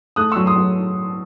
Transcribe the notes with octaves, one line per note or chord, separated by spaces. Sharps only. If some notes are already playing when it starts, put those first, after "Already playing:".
A3 D#6 F#6
F#3 C#6 E6
C6 D#6
F#3